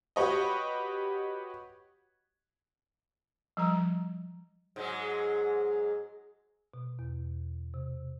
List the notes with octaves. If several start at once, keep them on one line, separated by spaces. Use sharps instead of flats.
F#4 G4 B4 C#5 D#5
F3 G3 A#5
G#2 F#3 G#3
B2
E2
C3